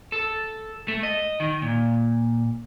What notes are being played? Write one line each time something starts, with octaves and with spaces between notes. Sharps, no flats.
A4
A3
D#5
D#3
A#2